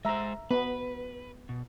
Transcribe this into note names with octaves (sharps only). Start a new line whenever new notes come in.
G#3 C5 E5 A#5
B3 B4
B2